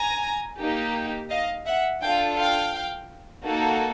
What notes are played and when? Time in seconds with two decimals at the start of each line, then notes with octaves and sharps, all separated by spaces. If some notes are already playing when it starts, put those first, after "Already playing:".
Already playing: G#5 A#5
0.60 A#3 D#4 G4
1.30 D#5 F5
1.66 E5 F#5
2.01 D4 F4 A4 F5 G5
2.37 F5 G5
3.44 A#3 D#4 F#4 A4